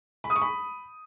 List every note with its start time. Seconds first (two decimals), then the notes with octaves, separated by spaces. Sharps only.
0.24 B5
0.30 D#6
0.36 C#6
0.42 B5